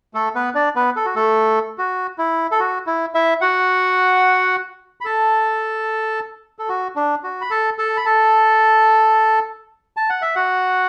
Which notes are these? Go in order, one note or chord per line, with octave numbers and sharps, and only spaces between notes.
A3 A4
B3 B4
D4 D5
B3 B4
A4
F#4
A3 A4
F#4
E4
A4
F#4
E4
E4 E5
F#4 F#5
B5
A4 A5
A4
F#4
D4
F#4
B5
A4 A5
A4 A5
B5
A4 A5
A5
F#5
E5
F#4 F#5